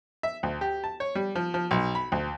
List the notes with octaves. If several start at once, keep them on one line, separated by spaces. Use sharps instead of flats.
E5
D2
G4
A5
C#5
G3
F3
F3
B1
B5
D2